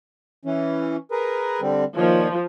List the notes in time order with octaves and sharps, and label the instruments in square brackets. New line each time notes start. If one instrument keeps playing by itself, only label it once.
[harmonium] E3 C#4
G#4 A#4 B4
D3 G3 C4
[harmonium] A#2 D#3 C#5 [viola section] F3